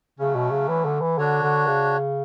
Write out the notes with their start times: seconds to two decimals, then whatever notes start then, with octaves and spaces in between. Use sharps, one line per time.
0.19 C#3 F#3 A3 C#4
0.35 B2
0.51 C#3
0.68 E3
0.85 D3
1.01 E3
1.18 D3 D4 F#4 C#5
1.43 D3
1.67 C#3